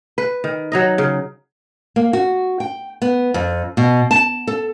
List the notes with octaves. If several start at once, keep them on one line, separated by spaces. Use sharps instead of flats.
B4
D#3
F#3 D#4 D#5
C#3
A#3
F#4
G5
B3
F2
B2
A5
A4